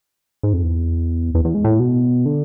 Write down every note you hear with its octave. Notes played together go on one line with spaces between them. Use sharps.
G#2
F2
E2
E2
E2
G#2
A2
B2
D3